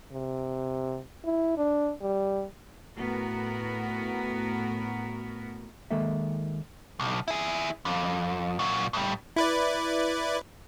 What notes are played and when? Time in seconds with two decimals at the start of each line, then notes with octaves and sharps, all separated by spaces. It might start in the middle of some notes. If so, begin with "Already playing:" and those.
0.12 C3
1.24 E4
1.57 D4
2.02 G3
2.95 A2 B3 F#4 A#4
5.91 D#3 G#3 A#3 A4 E5
7.00 B1
7.28 E4 G#4
7.85 F2
8.59 A#2 F#3
8.93 A2 G3
9.36 E4 B4 D5